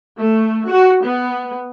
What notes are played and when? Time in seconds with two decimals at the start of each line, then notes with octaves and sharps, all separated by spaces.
0.17 A3
0.68 F#4
1.03 B3